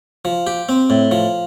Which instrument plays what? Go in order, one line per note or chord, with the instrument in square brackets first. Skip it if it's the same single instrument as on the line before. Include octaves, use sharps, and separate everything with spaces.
[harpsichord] F3
G4
C4
A2
F3